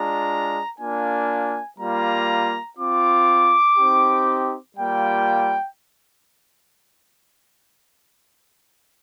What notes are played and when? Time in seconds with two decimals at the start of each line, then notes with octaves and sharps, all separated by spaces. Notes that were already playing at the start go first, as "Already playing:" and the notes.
Already playing: G#3 D4 F4 A#5
0.79 A#3 D4 F4 G#5
1.79 G3 A#3 F4 A#5
2.78 C4 F4 D6
3.78 C4 D#4 G4
4.77 G3 A#3 F4 G5